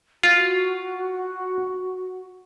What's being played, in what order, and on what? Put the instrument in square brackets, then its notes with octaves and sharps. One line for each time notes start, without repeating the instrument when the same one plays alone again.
[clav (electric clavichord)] F4 [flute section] F#4